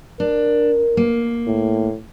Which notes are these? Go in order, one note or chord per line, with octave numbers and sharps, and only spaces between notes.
D4 A#4
A#3
A2